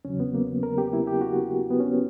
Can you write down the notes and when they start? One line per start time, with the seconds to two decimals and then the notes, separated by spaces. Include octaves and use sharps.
0.05 E2 C#3 F#3 C#4
0.20 B3
0.34 A#3
0.63 A#4
0.78 G4
0.93 E4
1.07 G4
1.21 F#4
1.71 B3
1.80 C#4